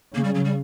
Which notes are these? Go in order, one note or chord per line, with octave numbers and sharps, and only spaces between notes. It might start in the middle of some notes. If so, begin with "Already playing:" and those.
C#3 A#3
G3
F#3
G3